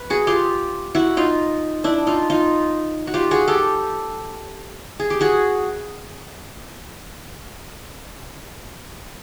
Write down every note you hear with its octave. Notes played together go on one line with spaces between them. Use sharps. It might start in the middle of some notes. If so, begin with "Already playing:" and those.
Already playing: B4
F#4 G#4
F4 G4
E4 F#4
D#4 F4
D4 E4
D#4 F4
D#4 F4
F#4
F4 G4
F#4 G#4
G4 A4
G#4
G4
F#4 G#4